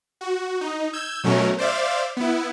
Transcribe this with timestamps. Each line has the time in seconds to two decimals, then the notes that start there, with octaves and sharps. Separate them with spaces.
0.21 F#4
0.61 D#4
0.93 E6 G6 G#6
1.24 B2 F#3 A3 C#4 A#4
1.58 C5 D5 E5 F5
2.17 B3 E4